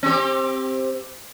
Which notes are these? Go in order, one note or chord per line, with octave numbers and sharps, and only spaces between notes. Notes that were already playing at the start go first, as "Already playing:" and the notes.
C4 G4